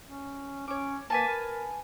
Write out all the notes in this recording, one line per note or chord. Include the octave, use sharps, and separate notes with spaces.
C#4
C#4 C#5 D6
A#3 B4 G#5 A5
A#4